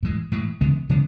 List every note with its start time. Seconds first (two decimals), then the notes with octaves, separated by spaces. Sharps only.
0.03 A2 E3 G#3
0.32 A2 E3 G#3
0.61 C#3 E3 G#3 B3
0.89 C#3 E3 G#3 B3